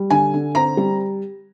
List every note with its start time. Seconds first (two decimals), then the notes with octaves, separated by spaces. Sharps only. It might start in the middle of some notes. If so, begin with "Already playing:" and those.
Already playing: G3
0.10 D3 G#5
0.34 D3
0.55 C4 A#5
0.77 G3